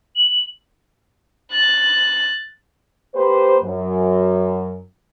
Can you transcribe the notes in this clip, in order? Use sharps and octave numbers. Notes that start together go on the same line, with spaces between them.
F#7
F#6 A6
A#3 G4 B4 C5
F#2